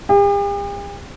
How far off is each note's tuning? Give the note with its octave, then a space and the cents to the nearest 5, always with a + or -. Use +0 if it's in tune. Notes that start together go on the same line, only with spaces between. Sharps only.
G4 +45